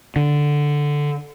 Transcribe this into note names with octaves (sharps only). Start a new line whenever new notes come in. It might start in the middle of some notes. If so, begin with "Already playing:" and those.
D3